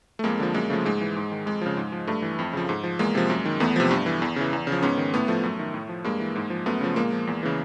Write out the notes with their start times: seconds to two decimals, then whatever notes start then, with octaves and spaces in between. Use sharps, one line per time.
0.19 A3
0.24 F2 G#3 A#3
0.39 D3 F3
0.54 F#2 G#3 A#3
0.70 C#3 F3 A3
0.85 G#2 G#3
1.01 E3
1.16 G#2
1.32 D#3
1.46 F2 G#3
1.61 C#3 F3
1.77 G#2
1.92 F3
2.07 G2 A3
2.22 E3
2.39 F2
2.53 C#3 F3
2.69 G#2
2.83 F3
2.99 E2 G#3 A#3
3.15 C3 F3
3.30 F#2
3.45 D#3
3.60 E2 A3 B3
3.76 C3 F3
3.91 G2
4.06 E3
4.22 E2
4.36 C#3 E3
4.53 E2
4.67 C#3
4.72 F3
4.82 G#2 B3 C#4
4.97 D#3
5.13 A2 A3 B3
5.28 F3 A3
5.43 F#2
5.59 D#3
5.74 A2
5.89 F3
6.04 G2 G#3 A#3
6.20 E3
6.36 G#2
6.50 F3
6.66 F#2 A3 B3
6.81 C#3 F3
6.96 A#2 G#3 A#3
7.12 F3
7.27 E2
7.43 C#3 E3